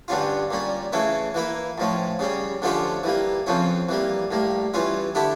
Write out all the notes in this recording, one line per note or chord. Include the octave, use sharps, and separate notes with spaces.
G2 D3 G3 C#4 F4
A#2 G3 C#4
C#3 E3 A3 C#4 E4
E3 A#3 E4
A2 F3 C#4
C#3 G3 C#4
D3 F3 A3 C#4 G4
E3 G3 A#3
F2 C#3 F3 C#4
E3 G3 A#3
A2 G3 A#3
E3 G3 C#4 F4
D3 A3 E4 G4